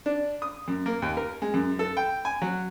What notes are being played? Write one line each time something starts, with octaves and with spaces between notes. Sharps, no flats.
D4
D#6
F#2
A#3
D#2
A#4
G#3
F#2
A4
G5
G#5
F#3